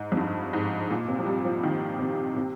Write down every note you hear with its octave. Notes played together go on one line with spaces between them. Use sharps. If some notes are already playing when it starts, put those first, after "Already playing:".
Already playing: G#2
F2
G2
G#2
A#2
C3
F3
G3
F3
D#3
C3
C3